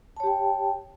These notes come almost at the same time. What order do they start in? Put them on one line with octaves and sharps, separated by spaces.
A5 C#5 G4 G5